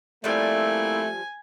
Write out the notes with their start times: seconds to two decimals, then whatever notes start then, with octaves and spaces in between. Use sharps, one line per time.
0.24 F3 G3 A3 A#3 C4 E4 G#5